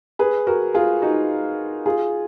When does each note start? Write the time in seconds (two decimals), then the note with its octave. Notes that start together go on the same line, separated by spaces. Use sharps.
0.19 G#4 B4
0.47 F#4 A#4
0.74 F4 G#4
1.02 D#4 F#4
1.86 F4 G#4